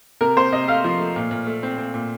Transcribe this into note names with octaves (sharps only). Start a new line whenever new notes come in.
C3 A#4
C3 C5
C3 D#5
A3 F5
F3
A3
A#2
A#2
A3
C4
C4
A#2